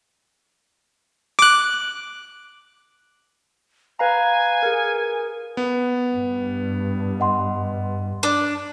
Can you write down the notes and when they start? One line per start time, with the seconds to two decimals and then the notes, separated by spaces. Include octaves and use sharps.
1.39 D6 F#6
3.99 B4 F5 G#5 A#5
4.63 G#4 A#4
5.57 B3
6.14 G2
7.20 D#5 F#5 C6
8.23 D4